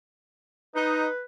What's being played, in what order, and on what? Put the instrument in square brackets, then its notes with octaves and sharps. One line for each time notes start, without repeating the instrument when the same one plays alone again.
[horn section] D#4 [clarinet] B4